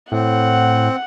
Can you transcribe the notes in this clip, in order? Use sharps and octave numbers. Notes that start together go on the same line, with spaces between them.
A2 C4 F#5